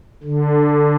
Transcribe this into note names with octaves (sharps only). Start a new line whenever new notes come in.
D3